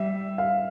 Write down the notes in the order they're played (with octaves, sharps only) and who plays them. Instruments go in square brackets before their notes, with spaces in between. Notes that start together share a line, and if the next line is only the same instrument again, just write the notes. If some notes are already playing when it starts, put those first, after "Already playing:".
Already playing: [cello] G3 [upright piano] E5
[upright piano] F5